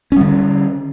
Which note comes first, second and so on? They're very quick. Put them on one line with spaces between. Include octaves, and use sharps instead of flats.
C#4 G3 D3